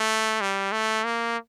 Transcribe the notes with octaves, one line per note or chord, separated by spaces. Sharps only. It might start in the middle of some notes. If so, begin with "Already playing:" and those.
Already playing: A3
G3
A3
A#3